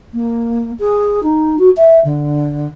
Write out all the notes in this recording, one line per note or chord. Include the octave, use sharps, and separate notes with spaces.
A#3
G#4
D#4
F#4
E5
D3